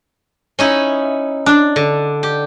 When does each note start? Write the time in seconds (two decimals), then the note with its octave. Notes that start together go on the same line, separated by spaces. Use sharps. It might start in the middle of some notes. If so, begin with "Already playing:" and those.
0.59 C#4 D#4 E4
1.46 D4
1.76 D3
2.23 G4